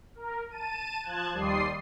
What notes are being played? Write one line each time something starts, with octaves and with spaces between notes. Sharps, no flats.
A#4
A5 D#7
F3 A5 F#6 G#6
D#2 G3 D5 C6 D#6 C7